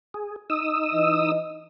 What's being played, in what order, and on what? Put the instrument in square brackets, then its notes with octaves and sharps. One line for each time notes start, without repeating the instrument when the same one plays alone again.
[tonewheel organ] G#4
D#4 D#6 E6
[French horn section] E3 D#5